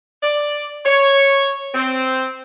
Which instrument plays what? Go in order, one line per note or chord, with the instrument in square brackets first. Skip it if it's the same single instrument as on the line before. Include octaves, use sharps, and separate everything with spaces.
[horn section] D5
C#5
C4